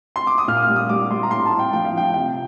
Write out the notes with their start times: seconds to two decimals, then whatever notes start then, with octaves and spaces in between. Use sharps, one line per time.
0.16 C6
0.27 D6
0.38 D#6
0.48 A#2 F6
0.57 D#6
0.62 F6
0.69 G3
0.76 D#6
0.89 G3 D6
1.10 G3 C6
1.23 A#5
1.31 A2 C6
1.45 A5
1.52 A2
1.59 G5
1.73 F3 G5
1.85 F5
1.93 F3 G5
2.14 C3 G5